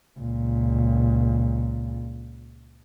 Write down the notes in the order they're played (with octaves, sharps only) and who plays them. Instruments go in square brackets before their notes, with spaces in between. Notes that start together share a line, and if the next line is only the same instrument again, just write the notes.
[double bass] C#2 A#2